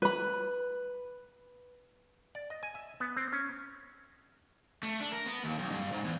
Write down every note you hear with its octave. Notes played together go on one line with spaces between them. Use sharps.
B4 B5
D5
D#5
G#5
E5
B3
C4
C#4
A3
D4
A#4
B3
D#2
B1
G2
G#2
E2